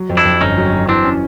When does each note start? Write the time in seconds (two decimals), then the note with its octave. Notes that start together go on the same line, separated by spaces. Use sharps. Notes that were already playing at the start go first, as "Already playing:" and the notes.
Already playing: F#3
0.09 F2
0.17 D4 E4
0.25 F2
0.41 G1 C#4 D#4
0.57 F#3
0.73 F#3
0.88 E3 C4 D4
1.05 C#4